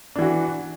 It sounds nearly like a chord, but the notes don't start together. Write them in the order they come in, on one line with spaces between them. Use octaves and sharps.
D4 E3 F#4